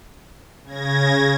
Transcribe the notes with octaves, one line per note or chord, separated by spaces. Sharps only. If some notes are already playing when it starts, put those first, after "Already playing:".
C#3 G#6 A#6